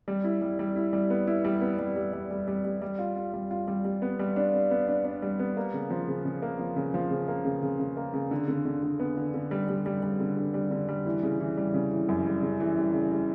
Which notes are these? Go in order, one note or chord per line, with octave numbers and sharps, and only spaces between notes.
G3
E4
G3
G3
E4
G3
B3
E4
G3
B3
G3
G3
G3
G3
G3
G3
G3
F4
F4
G3
F4
G3
G3
B3
G3
D4
B3
B3
D4
D4
G3
B3
A#3
C#3
F3
C#3
C#3
A#3
F3
C#3
F3
C#3
A#3
C#3
C#3
C#3
A#3
C#3
D3
D3
D3
D3
B3
D3
D3
G3
G3
G3
G3
D3
D3
G3
D3
G3
E3
C#3
E3
G3
C#3
E3
F#2
G3
C#3
E3
G3
C#3
G3